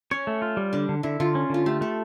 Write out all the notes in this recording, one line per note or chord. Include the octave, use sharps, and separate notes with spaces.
C#4 C#5
A3
F4
G3
D3 D4
D3
D3 E4
D3 F4
C#4
D3 F4
A3 G4
A3 A4